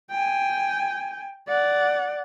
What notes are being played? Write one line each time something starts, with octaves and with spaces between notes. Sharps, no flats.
G5 G#5
D5 F#5